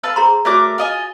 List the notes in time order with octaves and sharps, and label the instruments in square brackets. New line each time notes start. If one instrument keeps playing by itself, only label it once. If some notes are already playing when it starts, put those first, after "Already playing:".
[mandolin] A4 B4 F5 [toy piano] E6
[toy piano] G#4 A#5 C6 [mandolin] C5
[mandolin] A3 A#4 D6 [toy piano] F#4 C#5 D5
[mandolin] F4 D#5 G#5